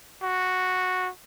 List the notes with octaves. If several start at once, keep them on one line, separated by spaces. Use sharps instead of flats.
F#4